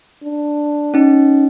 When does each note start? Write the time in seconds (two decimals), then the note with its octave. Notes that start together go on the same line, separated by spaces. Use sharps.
0.24 D4
0.94 C#4 D#4